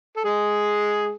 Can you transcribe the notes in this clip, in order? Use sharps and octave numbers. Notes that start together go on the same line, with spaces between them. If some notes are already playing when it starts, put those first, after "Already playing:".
A4
G#3 G#4